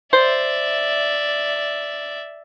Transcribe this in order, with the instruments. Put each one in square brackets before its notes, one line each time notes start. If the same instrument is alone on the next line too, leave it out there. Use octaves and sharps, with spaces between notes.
[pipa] C5 [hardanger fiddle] D5 E5